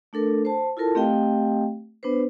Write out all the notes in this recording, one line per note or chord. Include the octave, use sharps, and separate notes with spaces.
A3 D4 A4 A#4
C5 A5
E4 F4 A4 A#4 A5
A3 C4 G4 D#5 F5 G5
B3 D4 B4 C5